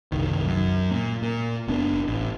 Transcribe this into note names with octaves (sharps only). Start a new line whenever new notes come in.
F#1 C2 D#3
F#2
A#2
A#2
F#1 B3 D4
A1